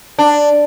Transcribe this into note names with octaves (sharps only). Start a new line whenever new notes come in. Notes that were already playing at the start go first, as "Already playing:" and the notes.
D4